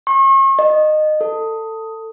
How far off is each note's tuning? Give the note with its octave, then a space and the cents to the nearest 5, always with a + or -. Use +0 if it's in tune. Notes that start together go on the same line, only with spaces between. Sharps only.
C#6 -40
D#5 -20
A4 +20